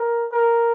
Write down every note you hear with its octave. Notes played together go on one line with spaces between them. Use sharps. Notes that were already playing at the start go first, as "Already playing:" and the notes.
Already playing: A#4
A#4